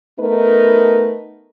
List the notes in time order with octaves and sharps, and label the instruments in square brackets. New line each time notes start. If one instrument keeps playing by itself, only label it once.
[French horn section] A3 B3 D#4 A#4 B4